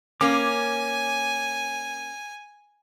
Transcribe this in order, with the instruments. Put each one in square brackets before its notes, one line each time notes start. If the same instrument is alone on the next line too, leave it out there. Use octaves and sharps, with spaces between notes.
[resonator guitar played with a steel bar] A#3 C#4 [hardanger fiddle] G#5 [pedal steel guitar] D6